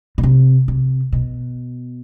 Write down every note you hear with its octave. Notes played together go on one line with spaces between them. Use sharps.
B2
C3
C3
B2